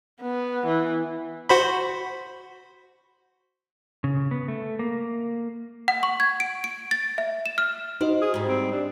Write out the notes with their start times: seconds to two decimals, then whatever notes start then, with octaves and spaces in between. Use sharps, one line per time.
0.21 B3
0.67 E3
1.49 F#4 C5 B5
4.04 C#3
4.31 B3
4.48 A3
4.79 A#3
5.88 F#5
6.03 C#6
6.20 G#6
6.40 D7
6.64 D7
6.91 A6
7.18 E5
7.46 E7
7.58 F6
8.01 D#4 F#4 C5 D#5
8.22 G#4 D#6
8.34 G#2 G3
8.48 C4
8.72 D4